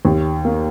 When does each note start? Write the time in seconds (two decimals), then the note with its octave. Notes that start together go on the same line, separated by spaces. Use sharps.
0.05 D#2
0.45 A#3